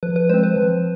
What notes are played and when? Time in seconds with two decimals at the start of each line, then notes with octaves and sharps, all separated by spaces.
0.03 F3 B4
0.16 B4
0.29 G#3 C4 C5
0.43 B4
0.56 F3